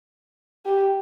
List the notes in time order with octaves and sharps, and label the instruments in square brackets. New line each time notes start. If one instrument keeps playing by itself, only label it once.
[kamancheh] G4